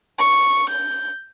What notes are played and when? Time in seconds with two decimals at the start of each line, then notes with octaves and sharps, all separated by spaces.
0.18 C#6
0.69 G6